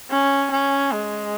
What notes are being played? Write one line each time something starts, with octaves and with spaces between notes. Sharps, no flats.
C#4
C#4
G#3